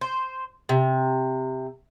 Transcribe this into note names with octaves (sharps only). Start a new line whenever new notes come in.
C5
C3